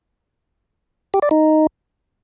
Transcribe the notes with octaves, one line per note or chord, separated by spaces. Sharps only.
G4
D5
D#4